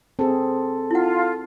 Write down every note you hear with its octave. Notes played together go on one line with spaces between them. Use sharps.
C4 G#4 A4
E4 F4 F#5